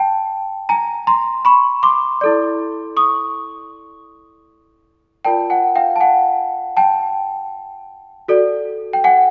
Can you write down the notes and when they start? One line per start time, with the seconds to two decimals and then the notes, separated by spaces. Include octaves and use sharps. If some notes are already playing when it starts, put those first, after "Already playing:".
Already playing: G5 A5
0.69 G#5 A#5
1.07 A#5 C6
1.45 B5 C#6
1.83 C6 D6
2.21 E4 A4 D5
2.97 C#6 D#6
5.25 F4 A#4 D5 G5 A5
5.50 F#5 G#5
5.75 F5 G5
5.96 A5
6.00 F#5 G#5
6.77 G5 A5
8.28 F#4 A4 D5
8.93 G5
9.04 F#5 G#5